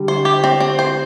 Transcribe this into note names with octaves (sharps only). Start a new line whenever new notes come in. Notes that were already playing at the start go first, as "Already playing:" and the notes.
Already playing: D3 G3
C5
G4
C4
C4
C5